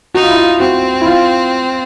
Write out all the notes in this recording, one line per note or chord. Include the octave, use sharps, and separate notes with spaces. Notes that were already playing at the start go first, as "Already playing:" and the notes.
D#4 F#4
F4
E4
F4
C4 F#4
E4
F4